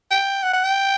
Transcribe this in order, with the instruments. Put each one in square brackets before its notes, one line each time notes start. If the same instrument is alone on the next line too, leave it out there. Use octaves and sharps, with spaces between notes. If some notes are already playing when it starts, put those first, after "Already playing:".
[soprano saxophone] G5
F#5
F#5
G5